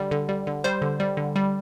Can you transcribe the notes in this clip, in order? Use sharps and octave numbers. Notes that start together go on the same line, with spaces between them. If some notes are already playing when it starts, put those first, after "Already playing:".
Already playing: D3 G3
D3
G3
D3
G3 C5
D3
G3
D3
G3